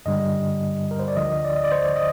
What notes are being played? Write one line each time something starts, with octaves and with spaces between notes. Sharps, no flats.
G2 D3 G3 D#5
A#4
C5
D5
D2 D3 F3 D#5
D5
D#5
D5
C5
D#5